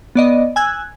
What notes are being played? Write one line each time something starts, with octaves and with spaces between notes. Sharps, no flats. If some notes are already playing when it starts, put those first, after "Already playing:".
B3 D5 D#5
G#5 E6 F#6 G#6